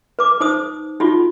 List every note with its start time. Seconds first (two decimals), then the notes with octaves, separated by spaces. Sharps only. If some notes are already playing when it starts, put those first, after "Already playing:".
0.19 B4 D6
0.40 D#4 C5 D#6
1.00 D#4 F4 F#4